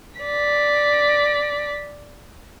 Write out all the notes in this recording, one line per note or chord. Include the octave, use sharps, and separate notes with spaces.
D5 B6